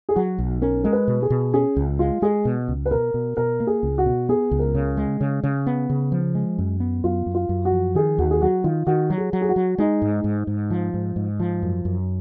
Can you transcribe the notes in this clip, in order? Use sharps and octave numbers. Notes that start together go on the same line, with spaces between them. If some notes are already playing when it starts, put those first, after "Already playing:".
G#4
F#3 F#4
B1
C#4 A#4
G#3 A#4
B4
B2
G#4
B2
C#4 G#4
C#2
G#3 F4
G#3 G#4
B2
C#2
B4
B2 A#4
B2
B2 A#4
A#3
G#4
C#2
F#4
B2
B3 G#4
C#2
A#4
C#3
G#3
C#3
C#3
B3
C#3
F3
G#3
F#2
B3
F#2 F4
F#2
F4
F#2
F#4
F3
D#3 G#4
D#2 F#4
G#4
F#3 F#4
D#3 F4
D#3 F#4
F#3
G#4
F#3
G#4
F#4
F#3
G#3 D#4
G#2
G#2
G#2
F3
G#2
G#2
F3
F#2
F#2